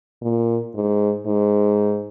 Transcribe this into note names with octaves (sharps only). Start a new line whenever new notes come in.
A#2
G#2
G#2